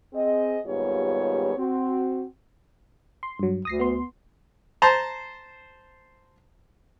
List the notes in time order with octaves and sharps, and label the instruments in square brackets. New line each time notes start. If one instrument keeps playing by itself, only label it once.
[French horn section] C4 G#4 D#5
D#2 G#2 G3 B3 F4 C#5
C4 F#4
[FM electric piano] C6
G2 F#3
[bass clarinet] D2 [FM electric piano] D#6 A#6 C7
[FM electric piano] B3 C6
[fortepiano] C5 A5 A#5